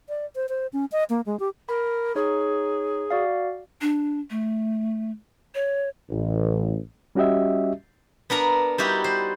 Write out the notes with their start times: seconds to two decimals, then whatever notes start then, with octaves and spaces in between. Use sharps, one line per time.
0.09 D5
0.36 C5
0.49 C5
0.73 C#4
0.92 D#5
1.10 A#3
1.26 G#3
1.40 G4
1.69 A#4 B5
2.15 D#4 G#4 C#5
3.11 F#4 D5 F5
3.81 D4
4.30 A3
5.55 C#5
6.10 A1
7.15 G3 C#4 F#4 G4 D#5 E5
8.30 B3 D4 A#4 A#5
8.78 G3 D#4 E4 F#4 G4
9.04 C5